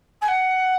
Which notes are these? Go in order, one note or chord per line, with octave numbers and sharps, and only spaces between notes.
G#5
F#5